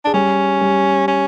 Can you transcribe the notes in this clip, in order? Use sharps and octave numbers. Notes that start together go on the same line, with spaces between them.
D4 G#4
G3 C#4 G4
G3 G4
C#4